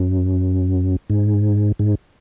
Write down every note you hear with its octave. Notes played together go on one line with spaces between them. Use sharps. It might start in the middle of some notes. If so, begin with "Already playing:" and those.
Already playing: F#2
G#2
G#2